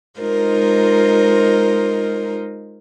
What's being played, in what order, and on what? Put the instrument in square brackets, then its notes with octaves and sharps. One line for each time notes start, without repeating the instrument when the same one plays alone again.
[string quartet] G#3 D#4 F4 A#4 C5